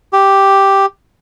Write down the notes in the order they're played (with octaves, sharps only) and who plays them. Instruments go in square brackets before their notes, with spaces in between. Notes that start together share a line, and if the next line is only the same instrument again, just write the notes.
[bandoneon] G4